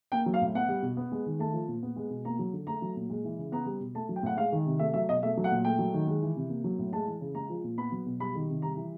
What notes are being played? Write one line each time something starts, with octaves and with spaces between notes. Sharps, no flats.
A#3 G5
F#3
F5
A2
B3 F#5
G3
B2
B3
G#3
D#3
A3 A5
F3
A#2
B3
G#3
B2
A#3 A#5
F#3
D3
A3 A#5
F#3
A#2
G#3
E3
C#3
B3 A#5
G3
B2
A3 A5
F#3
G5
A2 F#5
G#3 F5
D#3
C3
A3 E5
F#3 E5
B2 D#5
A3 E5
F#3
F#5
A#2
A3 G5
F#3
D#3
G#3
E3
C3
A#3
F#3
A2
G#3 A5
E3
C#3
G#3 A#5
F3
A#2
B3 B5
F#3
B2
G3 B5
D#3
C3
G3 A#5
E3